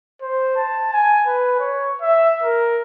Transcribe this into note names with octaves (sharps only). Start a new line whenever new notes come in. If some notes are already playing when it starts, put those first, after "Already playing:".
C5
A5
G#5
B4
C#5
E5
A#4